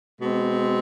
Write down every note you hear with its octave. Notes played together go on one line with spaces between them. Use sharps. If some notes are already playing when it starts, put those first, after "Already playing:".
B2 G#3 C4